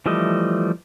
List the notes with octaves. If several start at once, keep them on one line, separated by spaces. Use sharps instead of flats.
E3 F3 G3 A3 D#5